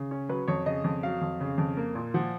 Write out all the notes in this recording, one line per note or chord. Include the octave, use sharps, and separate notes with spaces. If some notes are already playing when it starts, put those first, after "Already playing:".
Already playing: C#3
C#4
F#3 B4
F2 C#5
C#3 D#5
F2
F#3 F5
F2
C#3
F2
A#3
A#2
F3 F#5